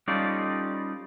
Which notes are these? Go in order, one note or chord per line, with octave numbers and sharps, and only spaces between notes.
G3 C#4 D#4 F4 A4 D5